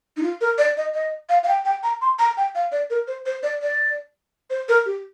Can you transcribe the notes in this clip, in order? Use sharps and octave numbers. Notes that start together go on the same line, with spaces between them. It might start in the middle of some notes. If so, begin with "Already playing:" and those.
D#4
F4
A#4
D5
D#5
D#5
F5
F5
G5
G5
A#5
C6
A#5
G5
F5
D5
A#4
C5
C5
D5
D5
C5
A#4
G4